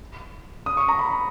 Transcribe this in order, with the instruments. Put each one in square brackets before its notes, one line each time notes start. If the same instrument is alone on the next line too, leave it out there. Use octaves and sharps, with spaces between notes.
[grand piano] D#6
C#6
A#5
B5